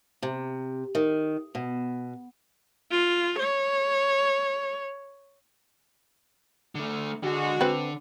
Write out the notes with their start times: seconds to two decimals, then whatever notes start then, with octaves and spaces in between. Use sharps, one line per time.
0.23 C3
0.95 D#3
1.55 B2
2.91 F4
3.39 C#5
6.75 D3 A3
7.23 D3 G#3 F#4
7.61 D3 C4 B4